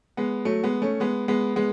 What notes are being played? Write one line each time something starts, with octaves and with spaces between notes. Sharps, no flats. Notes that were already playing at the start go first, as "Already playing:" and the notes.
G#3 B3
F#3 A3
G#3 B3
A3 C#4
G#3 B3
G#3 B3
G#3 B3